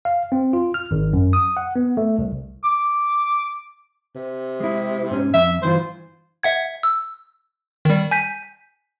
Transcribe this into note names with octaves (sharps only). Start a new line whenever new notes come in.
F5
C4
F4
F6
G#1
F#2
D#6
F#5
B3
A3
C2
D6
C3
G#3 E4
G#2 C#4
F2 E5
G2 E3 F4 C5
E5 F#5 G#6
E6
D#3 G3
G#5 G6 B6